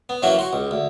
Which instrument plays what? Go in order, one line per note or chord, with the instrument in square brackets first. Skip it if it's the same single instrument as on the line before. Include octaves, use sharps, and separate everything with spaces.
[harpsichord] B3
F#2 E3 F#3 A#3 F#4 E5
F#4 C6
C#2
D2